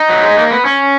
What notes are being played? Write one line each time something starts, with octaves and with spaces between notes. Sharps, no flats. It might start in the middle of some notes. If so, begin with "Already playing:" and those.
Already playing: D#4
F#3
G#3
A#3
B3
C#4